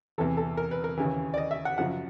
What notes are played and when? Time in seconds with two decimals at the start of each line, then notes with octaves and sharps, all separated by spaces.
0.18 E2 C3 E3 A4
0.37 A4
0.57 A#4
0.71 B4
0.84 A#4
0.97 D#2 C#3 E3
1.34 D5
1.38 D#5
1.51 E5
1.65 F#5
1.78 F#2 C#3 F3 F#5